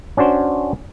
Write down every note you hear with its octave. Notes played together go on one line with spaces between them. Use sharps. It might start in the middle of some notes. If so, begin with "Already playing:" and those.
C#4 D4 F#4 C5